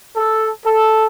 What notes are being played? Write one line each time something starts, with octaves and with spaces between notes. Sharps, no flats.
A4
A4